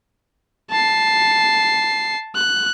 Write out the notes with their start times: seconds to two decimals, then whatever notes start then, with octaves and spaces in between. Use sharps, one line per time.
0.71 A5 C7
2.35 F#6